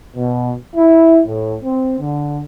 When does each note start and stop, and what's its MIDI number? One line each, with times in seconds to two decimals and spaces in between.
0.16 0.53 47
0.76 1.22 64
1.27 1.56 45
1.64 1.99 60
2.00 2.39 50